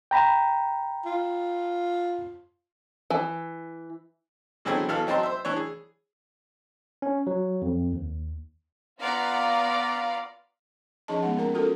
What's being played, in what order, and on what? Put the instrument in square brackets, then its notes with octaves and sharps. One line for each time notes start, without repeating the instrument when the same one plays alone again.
[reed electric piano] G5 A#5 B5
[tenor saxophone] F4
[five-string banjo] E3
[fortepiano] B2 D3 E3 F#3 C4 G#4
B2 E3 B3 A4 F5
F#3 C4 D#4 A5 C6
C5 E5
E3 D4 C#5
G#4
[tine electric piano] C#4
F#3
F2
D#2
[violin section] B3 F4 D5 F5 F#5 A#5
[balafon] F3 C#4 D#4 G#4 D#5 A5
G#3 B3 D#4 F#5
A#3 C#4 A#4 A#5
C#4 F4 F#4 A4 A#4